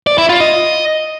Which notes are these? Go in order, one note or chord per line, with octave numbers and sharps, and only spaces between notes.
D5
E4
F4
D#5